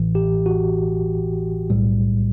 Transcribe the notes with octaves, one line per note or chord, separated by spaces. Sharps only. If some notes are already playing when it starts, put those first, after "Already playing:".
Already playing: A1 A2 E3
G4
F#4
B1 A2 G3